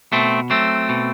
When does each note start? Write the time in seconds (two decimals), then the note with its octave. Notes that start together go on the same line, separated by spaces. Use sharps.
0.12 B2 A3 C4
0.50 F#3 A3 C4
0.89 B2